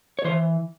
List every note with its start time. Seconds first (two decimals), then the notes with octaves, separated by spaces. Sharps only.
0.19 C#5
0.25 E3 C5